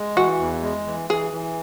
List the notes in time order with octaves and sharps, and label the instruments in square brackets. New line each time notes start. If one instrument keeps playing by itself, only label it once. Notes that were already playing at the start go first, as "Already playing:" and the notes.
Already playing: [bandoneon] G#3
[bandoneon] E3 [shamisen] F#4
[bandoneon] E2
G#3
E3
[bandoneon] E3 [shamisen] G#4
[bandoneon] E3